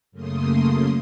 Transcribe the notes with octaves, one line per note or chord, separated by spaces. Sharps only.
F#2 C#3 A3 A#3 C6 D#6